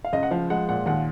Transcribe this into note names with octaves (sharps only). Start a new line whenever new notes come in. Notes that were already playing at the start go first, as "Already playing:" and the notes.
F5
C#2 D#5
F#5
F3 F5
G#3 F#5
A#2 F#5
D#2 F#5